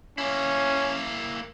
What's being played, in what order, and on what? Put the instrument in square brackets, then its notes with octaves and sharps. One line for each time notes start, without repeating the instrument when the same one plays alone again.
[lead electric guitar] A#3 E4 [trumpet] C#4